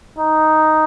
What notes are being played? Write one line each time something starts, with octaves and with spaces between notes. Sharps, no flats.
D#4